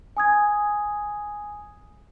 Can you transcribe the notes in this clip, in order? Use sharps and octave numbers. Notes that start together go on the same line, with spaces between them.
G#5 D#6 G#6